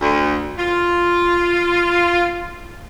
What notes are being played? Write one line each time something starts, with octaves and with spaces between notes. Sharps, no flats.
D2
F4